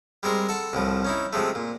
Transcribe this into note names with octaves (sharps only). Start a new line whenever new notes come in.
G3 G#3 C4 A#4
A4 F#5 A5
C2 A2 F3
C#4 D#4 E4
C3 F3 G#3 A3
A#2